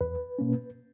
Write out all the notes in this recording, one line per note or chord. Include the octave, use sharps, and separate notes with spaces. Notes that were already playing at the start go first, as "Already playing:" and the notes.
E2 B4
B2 A#3 C#4